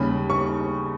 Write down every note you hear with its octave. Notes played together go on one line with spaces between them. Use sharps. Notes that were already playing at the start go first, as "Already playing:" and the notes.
Already playing: D#2 C#3 G3 B5
C#6